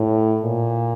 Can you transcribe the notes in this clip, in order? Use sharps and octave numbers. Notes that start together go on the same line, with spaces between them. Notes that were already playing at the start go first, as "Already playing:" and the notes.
Already playing: A2
A#2